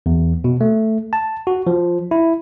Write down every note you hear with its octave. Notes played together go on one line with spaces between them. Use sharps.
E2
B2
A3
A5
F#4
F3
E4